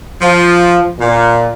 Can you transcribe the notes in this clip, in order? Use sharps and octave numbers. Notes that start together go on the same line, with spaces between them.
F3
A#2